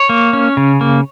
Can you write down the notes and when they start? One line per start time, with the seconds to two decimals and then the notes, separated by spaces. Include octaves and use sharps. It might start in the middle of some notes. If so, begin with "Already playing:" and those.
Already playing: C#5
0.09 A#3
0.33 C#4
0.57 C#3
0.81 A#3